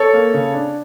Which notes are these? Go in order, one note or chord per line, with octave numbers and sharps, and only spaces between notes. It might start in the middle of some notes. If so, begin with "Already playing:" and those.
Already playing: A4 C#5
A#3
C#3
D4